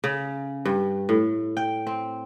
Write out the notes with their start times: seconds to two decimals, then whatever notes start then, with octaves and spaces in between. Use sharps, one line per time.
0.04 C#3
0.65 G2
1.09 A2
1.57 G5
1.87 C4